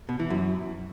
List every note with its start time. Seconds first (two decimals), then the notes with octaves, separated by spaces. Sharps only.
0.09 B2
0.20 E3
0.30 F#2